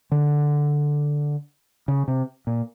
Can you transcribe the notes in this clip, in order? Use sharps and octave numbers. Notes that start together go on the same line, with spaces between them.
D3
C#3
C3
A#2